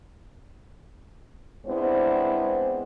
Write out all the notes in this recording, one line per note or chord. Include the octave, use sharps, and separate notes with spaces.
G#3 B3 C4 D4 E4 C5